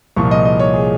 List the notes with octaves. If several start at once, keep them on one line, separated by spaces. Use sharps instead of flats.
C2 A#2 F3 C#6
D#5
D#5
C#5
G#4